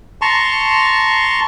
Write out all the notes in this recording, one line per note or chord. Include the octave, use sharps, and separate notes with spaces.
A5 A#5 C6 C#6